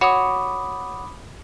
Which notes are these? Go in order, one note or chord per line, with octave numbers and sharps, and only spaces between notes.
F#4 C#5 B5 D6 D#6